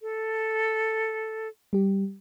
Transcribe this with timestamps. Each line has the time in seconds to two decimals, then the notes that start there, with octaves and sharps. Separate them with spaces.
0.01 A4
1.73 G3 G4